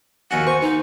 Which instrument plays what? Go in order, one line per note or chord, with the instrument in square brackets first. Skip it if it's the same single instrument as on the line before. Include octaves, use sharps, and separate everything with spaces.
[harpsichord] D#2 F#4 [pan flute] G#5
[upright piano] C5 [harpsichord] C#6
[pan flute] D#4